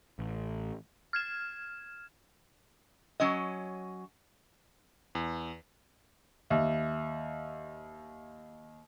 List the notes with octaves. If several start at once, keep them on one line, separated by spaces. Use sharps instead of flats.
A1
F6 G#6 E7
F#3 C#4 D#5
E2
D#2 E5